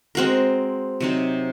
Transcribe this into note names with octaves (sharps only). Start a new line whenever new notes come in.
G#3 C4 F#4 A#4
C3 F#3 C4 D#4